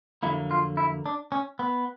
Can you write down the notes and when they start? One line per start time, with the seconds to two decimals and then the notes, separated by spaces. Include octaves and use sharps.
0.23 F2 D3 F#3 A#3 E4
0.51 F4
0.77 E4
1.06 D4
1.32 C#4
1.59 B3